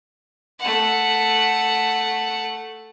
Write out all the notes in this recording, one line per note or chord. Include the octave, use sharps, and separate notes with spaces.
A3 F#5